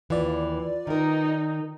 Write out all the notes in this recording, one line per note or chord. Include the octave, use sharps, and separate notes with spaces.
D#2 E3 F4 B4 D5
D#3 D#4 A#4